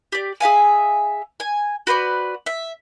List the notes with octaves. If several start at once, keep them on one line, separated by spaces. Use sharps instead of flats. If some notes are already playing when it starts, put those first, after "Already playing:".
G4 D5
G#4 E5 F5 G#5
G#5
F#4 B4 C5 D5
E5